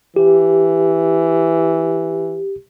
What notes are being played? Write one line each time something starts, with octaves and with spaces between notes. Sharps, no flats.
E3 G4